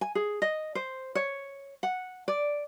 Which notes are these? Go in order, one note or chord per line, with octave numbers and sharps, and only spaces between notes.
G#5
G#4
D#5
C5
C#5
F#5
D5